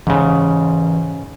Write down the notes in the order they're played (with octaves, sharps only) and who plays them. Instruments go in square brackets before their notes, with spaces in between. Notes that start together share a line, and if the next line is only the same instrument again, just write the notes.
[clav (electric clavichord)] G#2 C#3 [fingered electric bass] E3 C#4